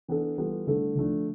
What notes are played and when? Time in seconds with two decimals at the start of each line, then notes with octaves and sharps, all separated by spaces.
0.08 E3 B3 D4 A4
0.38 E3 G3 B3 F4 A4
0.67 G2 D3 A3 E4 A4
0.95 D3 F3 A3 D4